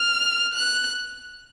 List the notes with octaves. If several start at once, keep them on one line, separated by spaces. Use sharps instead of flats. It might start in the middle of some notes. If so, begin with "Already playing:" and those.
Already playing: F6
F#6